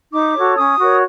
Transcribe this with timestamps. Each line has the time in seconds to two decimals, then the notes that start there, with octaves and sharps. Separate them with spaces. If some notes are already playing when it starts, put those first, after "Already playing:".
0.12 D#4 D6
0.34 F#4 A4 C#5
0.56 C#4 D#6
0.79 F#4 A#4 C#5